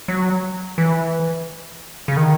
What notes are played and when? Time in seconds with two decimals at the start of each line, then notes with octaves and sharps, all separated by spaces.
0.08 F#3
0.78 E3
2.08 C#3
2.17 D#3